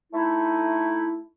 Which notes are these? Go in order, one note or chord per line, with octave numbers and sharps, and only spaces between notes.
A3 D#4 E4